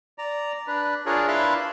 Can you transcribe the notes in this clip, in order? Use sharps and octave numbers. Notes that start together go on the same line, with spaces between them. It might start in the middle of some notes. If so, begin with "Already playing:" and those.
D5 A#5
D4 B4
D4 F4 G#4 A#4 C#5
D4 E4 B4 E5 F5 C6